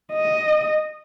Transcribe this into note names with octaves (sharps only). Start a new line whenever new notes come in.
D#5